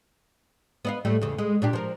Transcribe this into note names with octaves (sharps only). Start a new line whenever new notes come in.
B3 D#5 F5
A2 G3 A3
E2 C#3
G#3
A#2 D4 G4
F3 A#4